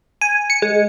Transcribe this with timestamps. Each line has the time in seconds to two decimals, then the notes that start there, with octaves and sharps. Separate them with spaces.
0.21 G#5
0.50 C#7
0.62 G#3